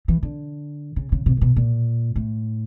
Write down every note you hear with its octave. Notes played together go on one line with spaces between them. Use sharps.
E3
D3
C#3
C#3
C3
A#2
B2
A#2
A2